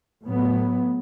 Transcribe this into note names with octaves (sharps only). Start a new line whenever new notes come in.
A2 F#3 B3